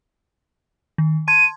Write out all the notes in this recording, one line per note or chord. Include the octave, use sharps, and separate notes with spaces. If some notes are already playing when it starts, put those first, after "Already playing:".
D#3
A5 C6 G#6 D#7